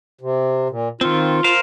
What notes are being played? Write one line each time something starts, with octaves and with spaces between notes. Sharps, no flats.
C3
A#2
D#3 C4 F4
A#4 C5 F5